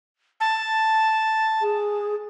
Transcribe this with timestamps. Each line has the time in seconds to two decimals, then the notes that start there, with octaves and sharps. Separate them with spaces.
0.40 A5
1.62 G#4